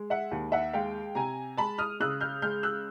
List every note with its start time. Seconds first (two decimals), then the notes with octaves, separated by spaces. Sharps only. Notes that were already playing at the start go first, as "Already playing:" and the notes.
Already playing: G#3
0.10 E5 F#5
0.31 D#2
0.52 E5 F#5
0.73 G#3 F5 G5
1.15 C3 G#5 A#5
1.57 G#3 A5 B5
1.78 D#6 F6
2.00 C#3 E6 F#6
2.21 F6 G6
2.42 G#3 F6 G6
2.63 E6 F#6